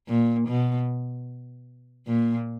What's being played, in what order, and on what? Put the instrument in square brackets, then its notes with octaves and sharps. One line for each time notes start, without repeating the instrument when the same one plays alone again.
[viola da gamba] A#2
B2
A#2